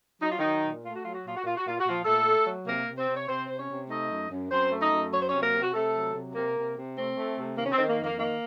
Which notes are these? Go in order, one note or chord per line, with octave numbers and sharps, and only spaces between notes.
F#3 D#4
F4
D#3 F#3 D#4
A#2
A3 F4
F#4
F#3 F4
F#4
A#2 F4
F#4
A#2 F4
F#4
A#2 F4
F#4
A#2 F3 F4
A#2 A3 A4
A3
F#3
C3 A#3 A#4
C3
C4 C5
C3
C#5
C3 C4 C5
C3 C5
C#4 C#5
C3
A3 D#4 D#5
F#2
F#2
F#2 C4 C5
A3
D#4 D#5
F#2
F#3 C#5
C5
C3 C#4 C#5
A#3 A#4
C3
F#4
C3 A3 A4
F#3
C3
C3 A#3 A#4
C3
C3
A3 C4
A3
C3
D#3 A#3
C#4
C4
D#3
A#3
F2
A#3
D#3 A#3